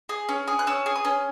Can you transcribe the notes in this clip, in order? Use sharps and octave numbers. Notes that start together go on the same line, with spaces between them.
G#4
C#4
G#4
F#6
C#4 E6
G#4
D#6
C#4